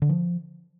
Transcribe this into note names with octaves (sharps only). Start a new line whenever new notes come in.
D3
F3